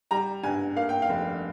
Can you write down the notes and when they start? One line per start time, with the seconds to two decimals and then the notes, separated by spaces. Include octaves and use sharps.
0.11 G3 A#5
0.43 G2 G#5
0.76 A#3 F5
0.89 G5
1.02 F5
1.09 F1